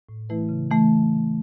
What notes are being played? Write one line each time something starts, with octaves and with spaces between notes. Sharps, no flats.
A2
E3 A3 E4 B4
C#3
E3 A3